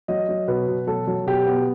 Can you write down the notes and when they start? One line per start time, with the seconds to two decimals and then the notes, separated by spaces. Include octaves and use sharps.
0.08 F#3 D#5
0.29 F#3
0.48 B2 B4
0.68 B2
0.87 F#3 A4
1.07 F#3
1.27 B2 G4
1.46 B3